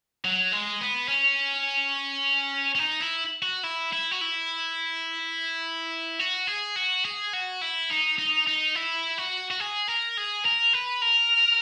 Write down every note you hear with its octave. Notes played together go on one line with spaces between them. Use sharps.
F#3
G#3
B3
C#4
C#4
D#4
E4
F#4
E4
E4
F#4
E4
F#4
G#4
F#4
G#4
F#4
E4
D#4
D#4
D#4
E4
F#4
F#4
G#4
A#4
G#4
A#4
B4
A#4